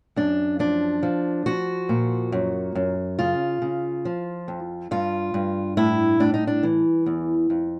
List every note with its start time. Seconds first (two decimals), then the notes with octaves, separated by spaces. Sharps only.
0.16 F#2 D4
0.59 F3 D4
1.03 F3
1.46 F3 F#4
1.89 A#2
2.32 F#2
2.75 F#2
3.19 C#3 F4
3.62 C#3
4.05 F3
4.48 F2
4.91 G2 F4
5.34 G2
5.77 A2 E4
6.20 A2 D4
6.34 D#4
6.47 D4
6.63 E3
7.06 E2
7.50 F2